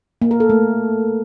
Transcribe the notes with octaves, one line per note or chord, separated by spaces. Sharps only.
A#3
A#4
A4
A3